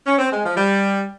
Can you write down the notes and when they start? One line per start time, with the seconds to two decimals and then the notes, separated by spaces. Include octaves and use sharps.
0.06 C#4
0.19 C4
0.32 G#3
0.45 F3
0.57 G3